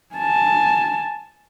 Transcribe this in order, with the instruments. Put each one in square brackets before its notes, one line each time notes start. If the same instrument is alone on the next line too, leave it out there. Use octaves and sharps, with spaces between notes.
[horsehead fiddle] G#5 A5